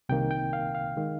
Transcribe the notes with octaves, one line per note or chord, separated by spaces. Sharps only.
C2 C3 D#3 A#3 G5
G5
F5
F5
D#3 G#3